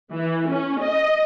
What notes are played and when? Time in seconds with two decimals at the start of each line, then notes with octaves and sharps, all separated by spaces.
0.12 E3
0.48 C#4
0.80 D#5